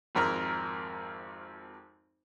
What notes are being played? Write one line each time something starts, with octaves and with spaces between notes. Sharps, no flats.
G#1 F2 A#4